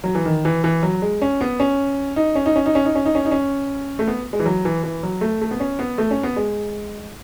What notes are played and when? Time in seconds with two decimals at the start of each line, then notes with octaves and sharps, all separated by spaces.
0.04 F#3
0.15 E3
0.25 D#3
0.45 E3
0.64 E3
0.83 F#3
1.02 G#3
1.22 C#4
1.41 B3
1.60 C#4
2.16 D#4
2.35 C#4
2.46 D#4
2.56 C#4
2.66 D#4
2.75 C#4
2.85 D#4
2.95 C#4
3.05 D#4
3.15 C#4
3.25 D#4
3.31 C#4
3.99 A3
4.08 B3
4.33 G#3
4.40 E3
4.46 F#3
4.65 E3
4.84 E3
5.03 F#3
5.21 A3
5.41 A3
5.51 B3
5.60 C#4
5.79 B3
5.98 A3
6.11 C#4
6.23 B3
6.36 G#3